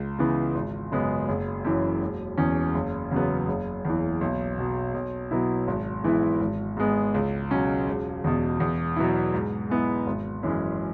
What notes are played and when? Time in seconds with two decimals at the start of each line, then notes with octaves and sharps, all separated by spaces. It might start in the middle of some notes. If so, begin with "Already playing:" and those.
Already playing: C#2
0.18 C#3 E3 B3
0.55 G#1
0.92 F#2 C#3 G#3 B3
1.29 F#1
1.65 F#2 E3
2.02 E1
2.37 E2 E3 C#4
2.74 F#1
3.11 E2 C#3 F#3 B3
3.48 F#1
3.85 E2 E3
4.21 B1
4.58 B2 F#3
4.94 B1
5.31 B2 F#3 B3 E4
5.68 G#1
6.04 G#2 E3 B3 E4
6.41 G#1
6.77 G#2 G#3 B3
7.14 C#2
7.50 B2 F#3 C#4
7.87 E1
8.24 E2 B2
8.60 E2
8.96 B2 F#3 B3 E4
9.34 G#2
9.70 G#3 B3 E4
10.07 G#1
10.43 F#2 E3 G#3 C#4